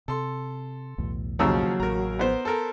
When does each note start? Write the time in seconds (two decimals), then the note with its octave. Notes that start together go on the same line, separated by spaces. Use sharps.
0.08 C3 A4 C6
0.98 B1 E2 A2
1.39 D#2 C#3 F3 F#3 A#5 E6
1.80 A1 A#4 A#5
2.19 B3 C5
2.45 A4 A#4